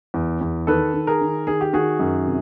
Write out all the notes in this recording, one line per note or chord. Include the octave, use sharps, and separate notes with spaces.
E2
E2
D#3 A4 B4
D#3
G#4 A#4
D#3
D#3 G#4
G4
D#3 F#4 G#4
F#2
C3